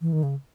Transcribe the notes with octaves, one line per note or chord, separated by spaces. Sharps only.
E3
D#3
C#3